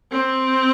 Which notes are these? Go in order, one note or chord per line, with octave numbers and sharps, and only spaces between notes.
C4